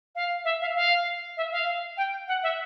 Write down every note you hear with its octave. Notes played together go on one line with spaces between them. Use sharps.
F5
E5
F5
F5
E5
F5
G5
F#5
E5